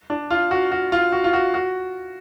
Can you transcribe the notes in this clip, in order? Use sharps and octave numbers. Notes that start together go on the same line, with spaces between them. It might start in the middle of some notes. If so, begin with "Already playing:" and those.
D4
F4
F#4
F#4
F4
F#4
F4
F#4
F#4